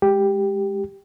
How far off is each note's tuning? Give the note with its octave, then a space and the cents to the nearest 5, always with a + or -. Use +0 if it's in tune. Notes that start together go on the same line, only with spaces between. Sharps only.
G#3 +0 G4 +5